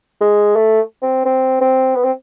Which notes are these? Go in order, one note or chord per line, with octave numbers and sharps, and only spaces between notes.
G#3
A3
C4
C4
C4
B3
C4